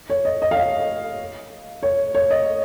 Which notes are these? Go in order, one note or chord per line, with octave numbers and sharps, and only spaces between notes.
C#5
D#5
D#5
F5
D#5
C#5
C#5
D#5